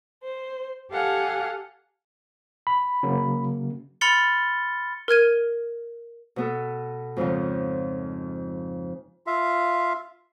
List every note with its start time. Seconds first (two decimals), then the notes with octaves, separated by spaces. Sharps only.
0.23 C5
0.91 G4 A4 F5 F#5 G#5
2.67 B5
3.03 C#3 F#3 A#3
4.01 B5 C6 F6 A6 C#7 G7
5.08 A#4 F6 G#6 D#7
6.36 B2 B3 A4
7.17 F2 G#2 C#3 F3
9.27 F4 E5 F5